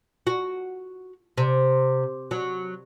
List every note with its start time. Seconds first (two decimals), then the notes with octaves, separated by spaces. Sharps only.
0.27 F#4
1.38 C3
2.31 F#3